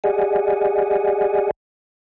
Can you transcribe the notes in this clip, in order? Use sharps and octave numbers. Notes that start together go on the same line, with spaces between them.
G4 G#4 D5 D#5 F#5 G#5